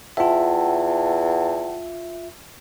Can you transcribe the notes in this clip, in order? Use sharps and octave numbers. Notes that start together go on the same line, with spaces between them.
E2 F4 E5 F#5 G5 A5